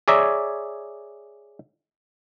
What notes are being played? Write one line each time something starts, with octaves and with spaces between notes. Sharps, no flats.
G#4 C#5 D5 E5 A#5